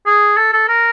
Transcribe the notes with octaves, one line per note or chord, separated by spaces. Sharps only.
G#4
A4
A4
A#4